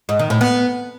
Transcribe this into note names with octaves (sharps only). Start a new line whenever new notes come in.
G#2
D#3
A2
B3